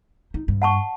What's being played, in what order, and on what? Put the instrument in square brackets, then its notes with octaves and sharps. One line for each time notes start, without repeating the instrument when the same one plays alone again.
[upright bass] D#4
G2
[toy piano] F#5 A5 C#6